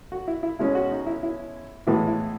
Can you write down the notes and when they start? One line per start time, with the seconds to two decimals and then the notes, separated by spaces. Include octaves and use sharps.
0.12 F#4
0.28 E4
0.43 E4
0.59 B2 G#3 C#4 E4
0.75 F#4
0.92 D#4
1.07 E4
1.23 E4
1.87 A2 E3 G#3 B3 E4
2.07 E4